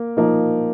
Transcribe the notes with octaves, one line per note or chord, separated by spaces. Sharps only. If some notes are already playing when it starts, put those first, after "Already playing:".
Already playing: A#3
F3 A#3 D#4